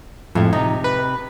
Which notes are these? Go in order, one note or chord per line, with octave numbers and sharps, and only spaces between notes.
F2 A2 G#3
C3 D#4
B4